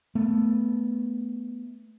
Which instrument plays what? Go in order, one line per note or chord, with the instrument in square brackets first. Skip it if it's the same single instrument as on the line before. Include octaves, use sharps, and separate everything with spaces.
[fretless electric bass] A3 B3